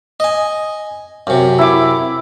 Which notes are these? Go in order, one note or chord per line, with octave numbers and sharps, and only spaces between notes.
D#5 G#5
F#2 C3
E4 D6